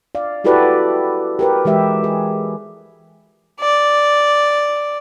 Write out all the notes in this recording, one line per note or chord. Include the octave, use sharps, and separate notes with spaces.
D5 F5
E4 F#4 G4 A4 B4 D5
G4 A#4 B4
E3 G#3 G4 E5
G#4
D5